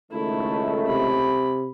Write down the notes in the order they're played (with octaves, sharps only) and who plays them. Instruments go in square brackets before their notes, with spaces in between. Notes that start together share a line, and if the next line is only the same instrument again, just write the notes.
[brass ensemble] C#2 D#3 A3 [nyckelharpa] E4
[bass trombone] C3 [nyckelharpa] B5